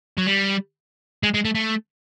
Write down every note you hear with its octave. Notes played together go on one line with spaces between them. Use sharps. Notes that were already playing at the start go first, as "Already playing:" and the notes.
F#3
G3
G#3
G#3
A3
A3